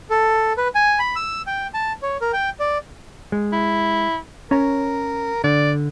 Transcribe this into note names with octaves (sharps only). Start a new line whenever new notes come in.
A4
B4
G#5
B5
E6
G5
A5
C#5
A#4
G5
D5
G#3
E4
C#4 A#4 C#5 A#5
D3 D5